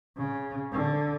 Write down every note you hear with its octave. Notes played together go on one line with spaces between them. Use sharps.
C#3
D3